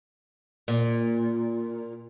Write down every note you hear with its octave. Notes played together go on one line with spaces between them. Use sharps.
A#2